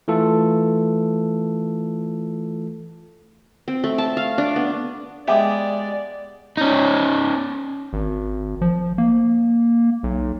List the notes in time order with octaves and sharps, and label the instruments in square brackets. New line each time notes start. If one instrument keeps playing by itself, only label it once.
[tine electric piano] E3 A3 F4 A4
[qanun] C4
A3
A5
F5
D4
B3
[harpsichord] G#3 B3 [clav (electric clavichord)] G4 [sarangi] D5 [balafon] E5
[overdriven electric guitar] C#4 D#4
[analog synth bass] G#1
F3
A#3
B1